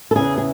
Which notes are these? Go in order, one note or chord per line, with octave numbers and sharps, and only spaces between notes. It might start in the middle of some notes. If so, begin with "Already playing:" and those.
A4
E2 C#3 E3 G#4
G#4